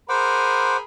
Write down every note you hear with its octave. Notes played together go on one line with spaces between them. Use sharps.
G#4 A#4 C5 F#5 B5 D6